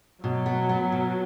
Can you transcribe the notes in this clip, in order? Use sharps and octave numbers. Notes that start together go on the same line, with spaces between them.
B2 F#3
B3
B3
B2